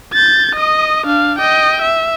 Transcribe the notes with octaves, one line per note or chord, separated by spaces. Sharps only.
G6 A6
D#5 D#6
D4 F5
D#5 G5
E5